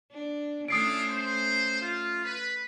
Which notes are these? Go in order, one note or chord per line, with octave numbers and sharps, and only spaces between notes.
D4
A3 C#4 D4 E4 F4 D#6 C7 D7
C5
F4
B4